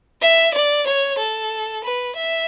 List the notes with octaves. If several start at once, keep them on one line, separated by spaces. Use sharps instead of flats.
E5
D5
C#5
A4
B4
E5